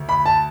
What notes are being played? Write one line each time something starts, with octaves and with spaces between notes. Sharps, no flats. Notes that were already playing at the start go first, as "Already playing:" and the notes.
Already playing: D2
B5
A5